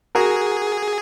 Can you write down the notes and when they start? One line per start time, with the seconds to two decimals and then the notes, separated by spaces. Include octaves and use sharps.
0.15 F#4 G#4 A#4